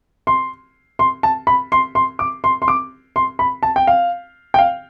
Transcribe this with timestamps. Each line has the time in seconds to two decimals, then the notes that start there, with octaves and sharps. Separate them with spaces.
0.27 C6
0.99 C6
1.23 A5
1.47 B5
1.72 C6
1.95 C6
2.19 D6
2.44 C6
2.62 C6
2.68 D6
3.16 C6
3.39 B5
3.63 A5
3.76 G5
3.87 F5
4.54 G5
4.59 F5